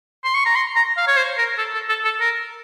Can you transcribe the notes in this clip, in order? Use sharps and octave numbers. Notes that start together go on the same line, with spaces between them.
C6
C#6
A#5
C6
A#5
F5
C#5
C5
A#4
A4
A4
A4
A4
A#4